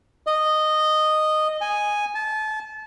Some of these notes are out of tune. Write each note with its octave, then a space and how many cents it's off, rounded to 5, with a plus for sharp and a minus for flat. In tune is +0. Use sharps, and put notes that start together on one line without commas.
D#5 -10
G#5 -5
A5 -30